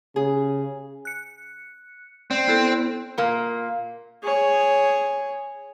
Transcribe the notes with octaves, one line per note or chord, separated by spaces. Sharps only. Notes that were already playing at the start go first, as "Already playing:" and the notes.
C#3 G#4
F#6 C#7
C4 D5
B3 E4 A4
A#2 A#3
G#4 C#5